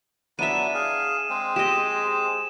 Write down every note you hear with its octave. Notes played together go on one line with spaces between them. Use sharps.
F#3 B3 D4 E4 E5 D#7 E7
G#4 F5
G#3 C4 G#4
G4 D#5 E7